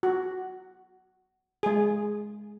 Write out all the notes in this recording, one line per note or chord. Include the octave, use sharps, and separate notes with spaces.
F#4
G#3 G#4